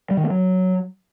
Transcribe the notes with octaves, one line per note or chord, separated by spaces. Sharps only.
G3
D#3
A#3
F#3